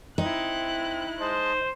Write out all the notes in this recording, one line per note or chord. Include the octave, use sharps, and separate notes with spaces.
C4 D#4 E4 F#6
G#3 C5 D#5 A5